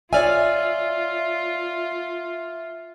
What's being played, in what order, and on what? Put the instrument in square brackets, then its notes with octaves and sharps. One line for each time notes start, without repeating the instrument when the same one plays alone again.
[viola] F4 [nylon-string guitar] C#5 D5 G#5 [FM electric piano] E5 F6